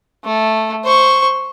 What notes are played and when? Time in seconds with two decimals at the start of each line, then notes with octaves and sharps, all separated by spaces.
0.25 A3
0.84 C5 C#6